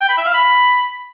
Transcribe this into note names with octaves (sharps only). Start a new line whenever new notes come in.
G5
B5
E5
F5
B5